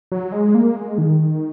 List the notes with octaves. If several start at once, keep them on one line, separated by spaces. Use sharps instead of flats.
F#3
G#3
A#3
G#3
D#3